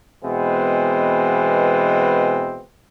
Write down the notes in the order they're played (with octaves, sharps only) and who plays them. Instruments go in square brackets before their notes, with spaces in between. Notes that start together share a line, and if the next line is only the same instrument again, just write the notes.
[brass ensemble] B2 E3 G#3 B3 C4